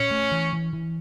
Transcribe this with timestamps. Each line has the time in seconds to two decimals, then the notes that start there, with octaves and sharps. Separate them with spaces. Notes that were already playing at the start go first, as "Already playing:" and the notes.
Already playing: A#2 C#4
0.11 A3
0.32 E3
0.53 E3
0.73 E3